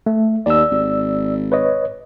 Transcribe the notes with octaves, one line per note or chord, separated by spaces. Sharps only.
A3
D#2 D5 E6
G#1
B4 C#5 D#5